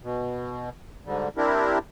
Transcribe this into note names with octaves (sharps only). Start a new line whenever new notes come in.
B2
G#2 D3 G3
G3 C4 D4 E4 G4 A#4